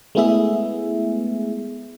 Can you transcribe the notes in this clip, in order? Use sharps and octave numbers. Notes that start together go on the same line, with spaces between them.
G#3 A3 B3 E4 G#4 E5